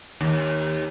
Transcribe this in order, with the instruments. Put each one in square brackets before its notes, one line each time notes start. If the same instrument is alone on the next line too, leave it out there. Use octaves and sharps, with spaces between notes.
[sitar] D#2